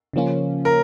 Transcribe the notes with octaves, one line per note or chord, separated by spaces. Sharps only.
C#3 F3 A#3 C#4 F4
A#4